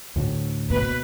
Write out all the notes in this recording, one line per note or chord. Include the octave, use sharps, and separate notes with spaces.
D2 A2 D3
B2 B4